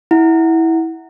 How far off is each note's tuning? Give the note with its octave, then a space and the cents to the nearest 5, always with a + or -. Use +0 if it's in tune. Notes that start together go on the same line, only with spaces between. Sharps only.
E4 -15 F#5 +0